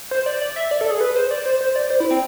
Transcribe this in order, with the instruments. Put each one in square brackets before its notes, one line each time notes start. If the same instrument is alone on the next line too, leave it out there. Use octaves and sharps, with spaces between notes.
[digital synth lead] C5
D5
D5
E5
D5
A4
G#4
B4
C5
D5
C5
C5
D5
C5
E4
C4